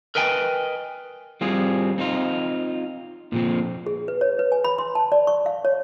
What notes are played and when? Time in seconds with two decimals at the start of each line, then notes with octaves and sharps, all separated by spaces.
0.15 A#4 B4 D#5 G5 G#5
1.41 G3 C4 F4 G#4
1.98 C4 D#4 F4
3.32 A#2 F3 C4
3.86 G#4
4.08 B4
4.21 C#5
4.39 B4
4.52 G#5
4.64 B5
4.78 C6
4.95 A5
5.12 D5
5.27 C#6
5.46 F5
5.65 C#5